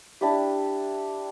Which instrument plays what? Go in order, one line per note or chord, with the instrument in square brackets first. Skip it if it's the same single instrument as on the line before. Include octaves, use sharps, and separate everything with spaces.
[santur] D4 E4 G4